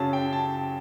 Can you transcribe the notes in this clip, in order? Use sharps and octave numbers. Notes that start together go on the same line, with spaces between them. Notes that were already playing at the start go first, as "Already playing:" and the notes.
Already playing: F#2 C#3 F#3 A5
G5
A5